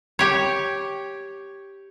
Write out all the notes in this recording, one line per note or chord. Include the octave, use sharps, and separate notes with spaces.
G4 C#5